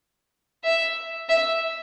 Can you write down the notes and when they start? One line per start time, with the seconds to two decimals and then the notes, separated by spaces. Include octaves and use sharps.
0.64 E5
1.29 E5